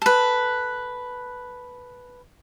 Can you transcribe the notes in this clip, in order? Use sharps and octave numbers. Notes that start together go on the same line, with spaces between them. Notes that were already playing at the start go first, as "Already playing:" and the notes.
A4 B4